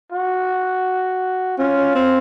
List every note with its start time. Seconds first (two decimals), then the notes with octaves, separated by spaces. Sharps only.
0.12 F#4
1.58 C#4 F4
1.95 C4